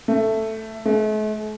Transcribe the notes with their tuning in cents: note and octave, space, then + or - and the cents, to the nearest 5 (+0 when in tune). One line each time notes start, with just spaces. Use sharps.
A3 +5
A3 -45